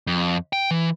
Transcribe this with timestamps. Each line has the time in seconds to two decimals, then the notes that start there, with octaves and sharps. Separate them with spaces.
0.07 F2
0.53 G5
0.71 E3